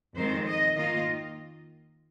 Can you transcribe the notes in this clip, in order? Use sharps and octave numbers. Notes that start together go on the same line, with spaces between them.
F2 D#3 G#3 C4 C5
D#5
D#3 A#3 F4 D#5